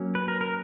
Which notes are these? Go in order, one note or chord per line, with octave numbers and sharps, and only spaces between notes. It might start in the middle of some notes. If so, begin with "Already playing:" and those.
Already playing: F#3 A#3 C#4
B4
A#4
A#4